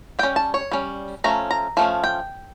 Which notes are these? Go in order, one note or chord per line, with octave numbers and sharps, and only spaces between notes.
G3 C#4 G5
A5
C#5
G3 C#4
F3 A3 C#4 A#5
A#5
F3 A3 C#4
G5